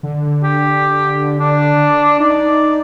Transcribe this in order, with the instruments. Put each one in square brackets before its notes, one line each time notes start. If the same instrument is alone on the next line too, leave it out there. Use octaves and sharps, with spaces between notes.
[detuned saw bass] D3
[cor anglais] G4
D4
[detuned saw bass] D#4 [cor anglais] D5